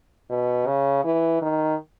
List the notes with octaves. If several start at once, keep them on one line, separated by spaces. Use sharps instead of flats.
B2
C#3
E3
D#3